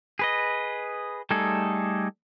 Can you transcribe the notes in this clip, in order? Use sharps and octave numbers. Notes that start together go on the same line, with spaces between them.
G#4 B4 D#5
G3 A3 D#4 G#4 A4